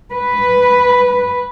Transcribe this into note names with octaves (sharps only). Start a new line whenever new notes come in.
B4